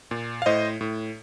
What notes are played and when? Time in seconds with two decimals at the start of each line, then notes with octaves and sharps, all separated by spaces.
0.11 A#2
0.42 F5
0.46 A2 C5 D#5
0.81 A2